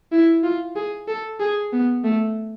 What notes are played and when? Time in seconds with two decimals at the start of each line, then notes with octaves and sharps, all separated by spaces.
0.12 E4
0.43 F4
0.76 G#4
1.08 A4
1.40 G#4
1.73 B3
2.04 A3